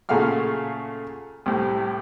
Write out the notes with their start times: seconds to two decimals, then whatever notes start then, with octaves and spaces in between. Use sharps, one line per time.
0.09 A#2 C#3 A3 F#4 F5 F6
1.46 C2 A2